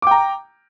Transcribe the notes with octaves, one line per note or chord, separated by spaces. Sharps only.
G5 A#5 D6